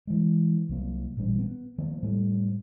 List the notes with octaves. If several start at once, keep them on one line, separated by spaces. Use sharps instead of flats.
E3 G#3
C2 F#3 A#3
A1 A#2 G3 D4
B3
D#3 F3 A#3 B3
A2 G3 A3 B3